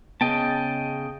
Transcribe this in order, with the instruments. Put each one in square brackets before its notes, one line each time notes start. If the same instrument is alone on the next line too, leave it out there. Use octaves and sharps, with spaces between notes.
[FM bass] C#3 [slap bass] B3 [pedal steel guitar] D#5 G5 A5